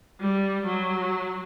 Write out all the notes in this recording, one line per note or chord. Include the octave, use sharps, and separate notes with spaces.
G3
F#3